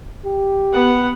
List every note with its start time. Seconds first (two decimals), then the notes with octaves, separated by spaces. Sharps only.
0.25 G4
0.73 B3 F#5